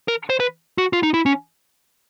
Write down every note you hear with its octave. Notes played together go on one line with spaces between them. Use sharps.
A#4
C5
B4
F#4
F4
D#4
E4
C#4